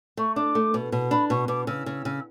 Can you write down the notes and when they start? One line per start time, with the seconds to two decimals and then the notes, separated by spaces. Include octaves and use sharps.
0.17 A3 C#6
0.36 D4 D6
0.55 A3
0.74 B2
0.92 B2
1.11 D4 B5
1.30 B2 C#6
1.48 B2 D6
1.67 C#3 E6
1.86 C#3
2.05 C#3